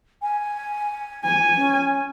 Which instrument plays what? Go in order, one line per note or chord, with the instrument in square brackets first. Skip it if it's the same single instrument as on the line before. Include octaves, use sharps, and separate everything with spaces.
[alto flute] G#5
[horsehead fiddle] G#5
[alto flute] C#4